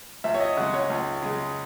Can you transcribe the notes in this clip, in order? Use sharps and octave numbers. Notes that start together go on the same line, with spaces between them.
C#2 E5
C#5
D#5
C#3 G#3 F#5
C#5
C#2
C#3 G#3